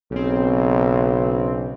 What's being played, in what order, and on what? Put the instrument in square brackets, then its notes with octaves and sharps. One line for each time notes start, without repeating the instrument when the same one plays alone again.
[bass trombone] B1 [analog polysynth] C#3 C4